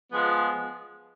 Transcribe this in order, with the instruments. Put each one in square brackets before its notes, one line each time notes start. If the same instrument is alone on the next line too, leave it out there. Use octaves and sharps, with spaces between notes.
[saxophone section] F3 G#3 B3